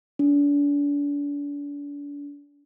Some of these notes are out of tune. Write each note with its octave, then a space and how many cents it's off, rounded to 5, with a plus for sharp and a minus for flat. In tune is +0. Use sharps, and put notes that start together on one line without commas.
D4 -40